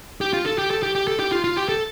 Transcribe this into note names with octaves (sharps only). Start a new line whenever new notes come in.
G4
F4
A4
G4
A4
G4
G4
A4
G4
F4
F4
G4
A4